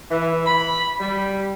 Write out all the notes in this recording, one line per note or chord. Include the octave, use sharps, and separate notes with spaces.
E3
B5
G3